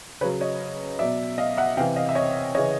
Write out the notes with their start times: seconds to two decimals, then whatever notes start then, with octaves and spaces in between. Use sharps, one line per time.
0.21 C#3 F#3 B4 C#5
0.41 C#5 D#5
0.99 B2 F#3 D5 E5
1.38 D#5 F5
1.57 E5 F#5
1.77 C3 F5 G5
1.80 E3
1.96 D#5 F5
2.09 E5
2.15 C#5 D#5
2.55 C#3 E3 C#5 D#5